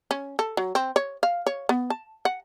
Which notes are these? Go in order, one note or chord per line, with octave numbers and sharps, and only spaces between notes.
C#4
A4
F#3
C4
C#5
F5
C#5
B3
A5
F#5